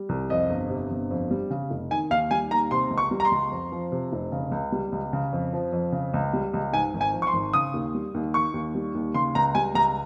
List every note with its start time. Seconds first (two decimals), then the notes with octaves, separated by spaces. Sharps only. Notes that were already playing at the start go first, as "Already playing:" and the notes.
Already playing: G3
0.09 C2
0.30 F2 D#5
0.49 G1
0.70 C3
0.91 G1
1.11 F2
1.31 G3
1.50 C#3
1.70 F1
1.91 D#3 G#5
2.11 D#2 F5
2.31 G3 G#5
2.51 D#2 A#5
2.71 C3 C6
2.91 C#2
2.98 C#6
3.11 G3
3.20 A#5
3.25 C6
3.31 C#2
3.51 F2
3.72 F3
3.92 C3
4.12 F1
4.32 C#3
4.52 C#2
4.72 G3
4.92 C#2
5.13 C#3
5.33 F2
5.53 F3
5.72 F2
5.92 C#3
6.14 C#2
6.33 G3
6.54 C#2
6.73 G#2 G#5
6.94 G#1
7.01 G#5
7.13 F3
7.22 C#6
7.27 C6
7.33 G#1
7.53 C#3 D#6
7.74 D#2
7.95 G3
8.14 D#2
8.34 D#3 C#6
8.54 D#2
8.75 G3
8.95 D#2
9.14 C#3 C6
9.35 C#2 A#5
9.55 G3 G#5
9.75 C#2 A#5